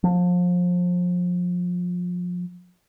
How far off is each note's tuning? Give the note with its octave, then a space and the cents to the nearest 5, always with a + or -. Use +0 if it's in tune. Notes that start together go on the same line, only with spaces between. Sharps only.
F3 +30